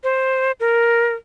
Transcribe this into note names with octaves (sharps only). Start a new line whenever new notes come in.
C5
A#4